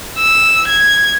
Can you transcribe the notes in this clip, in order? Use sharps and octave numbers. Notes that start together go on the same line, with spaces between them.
E6
G#6